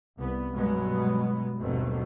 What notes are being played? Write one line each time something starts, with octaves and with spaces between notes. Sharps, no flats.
C2 B3
G2 B2 F#3 G#3 B3
G1 D#2 B2 F#3 A3 C4